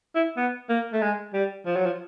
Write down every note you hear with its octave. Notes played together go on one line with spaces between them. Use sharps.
E4
B3
A#3
A3
G#3
G3
F3
F#3
F3